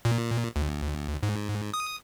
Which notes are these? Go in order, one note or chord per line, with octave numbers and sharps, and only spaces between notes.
A#2
D2
G#2
D#6